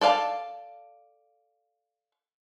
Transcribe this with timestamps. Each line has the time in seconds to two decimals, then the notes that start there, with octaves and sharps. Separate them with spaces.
0.01 A4 D5 F5 G#5 A5